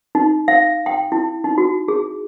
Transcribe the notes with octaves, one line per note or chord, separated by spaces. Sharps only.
D#4
F5
G5
E4
D#4
F#4
G#4